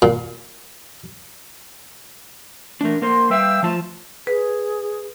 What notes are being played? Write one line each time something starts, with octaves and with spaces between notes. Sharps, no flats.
A#2
E3 A3 D4 A#4
A#3 A#4 C5 C6
G3 B4 E5 F5 G5 E6
F3 A3 F4 C5 A5
G#4 B4